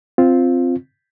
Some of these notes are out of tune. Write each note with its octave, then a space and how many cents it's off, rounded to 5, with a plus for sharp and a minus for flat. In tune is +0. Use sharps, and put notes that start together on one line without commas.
C4 +0 F4 +0